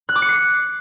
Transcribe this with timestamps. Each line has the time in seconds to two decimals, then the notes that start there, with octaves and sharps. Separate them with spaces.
0.09 F#6
0.15 D6
0.22 C#7
0.29 C7